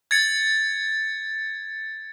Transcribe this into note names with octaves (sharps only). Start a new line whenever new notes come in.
G#6 A6 C#7